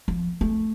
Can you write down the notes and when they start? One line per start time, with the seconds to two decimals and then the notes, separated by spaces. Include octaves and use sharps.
0.08 F3
0.41 A3